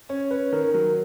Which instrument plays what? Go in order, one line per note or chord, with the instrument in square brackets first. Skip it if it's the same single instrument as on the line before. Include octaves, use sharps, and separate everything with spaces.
[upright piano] C#4 [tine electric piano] C#5
[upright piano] C#4 [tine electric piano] B4
[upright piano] D#3 [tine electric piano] A#4
[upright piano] F#3 [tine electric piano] A#4